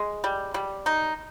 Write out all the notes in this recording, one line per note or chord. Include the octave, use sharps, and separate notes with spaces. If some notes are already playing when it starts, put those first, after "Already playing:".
Already playing: G#3
G3
G3
D#4